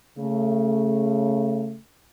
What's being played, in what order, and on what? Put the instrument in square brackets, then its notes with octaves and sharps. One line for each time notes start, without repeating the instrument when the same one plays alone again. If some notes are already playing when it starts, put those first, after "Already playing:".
[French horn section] C#3 A3